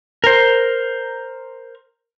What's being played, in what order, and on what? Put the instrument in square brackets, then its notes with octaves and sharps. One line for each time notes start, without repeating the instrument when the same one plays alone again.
[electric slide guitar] A#4 C5